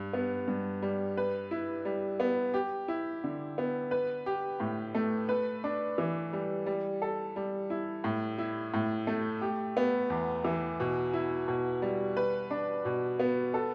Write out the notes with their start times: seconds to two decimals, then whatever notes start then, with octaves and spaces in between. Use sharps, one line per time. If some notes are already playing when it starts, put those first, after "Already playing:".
Already playing: G2
0.13 B3
0.47 G2
0.82 G3
1.17 B4
1.51 E4
1.85 G3
2.20 B3
2.54 G4
2.88 E4
3.24 D3
3.58 B3
3.91 B4
4.26 G4
4.60 A2
4.95 A3
5.29 B4
5.64 D4
5.98 E3
6.33 G3
6.66 G3
7.02 A4
7.36 G3
7.70 E4
8.04 A2
8.38 E4
8.74 A2
9.07 A3
9.41 G4
9.77 B3
10.10 E2
10.44 E3
10.80 B2
11.13 E4
11.48 B2
11.82 G3
12.17 B4
12.51 D4
12.85 B2
13.20 B3
13.54 A4